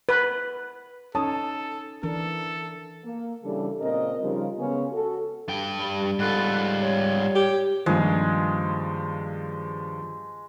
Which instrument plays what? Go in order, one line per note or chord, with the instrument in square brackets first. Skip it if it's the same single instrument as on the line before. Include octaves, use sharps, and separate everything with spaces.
[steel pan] B4
[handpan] C#4 D#4 C#5 [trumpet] A4 [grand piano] A5 D#6
[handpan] E3 D4 A#4 [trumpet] A4
[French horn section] A#3
C#3 E3 G3 D4 A4
A#2 C#3 C4 A#4 D#5
C#3 F3 G3 D#4 F4 A#4
C#3 G#3 B3 C#4
F#4 A4
[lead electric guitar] G2 G5
[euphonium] G3
[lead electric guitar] G#2 F4 [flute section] A4 B5 F#6
[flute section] C#5
[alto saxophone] G4
[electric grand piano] G2 F3 [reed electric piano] D#3 G3 A#3 [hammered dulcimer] G#3